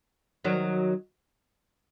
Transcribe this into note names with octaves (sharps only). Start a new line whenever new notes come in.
D#3 F#3